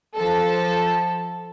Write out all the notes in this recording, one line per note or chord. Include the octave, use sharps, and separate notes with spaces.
F3 A4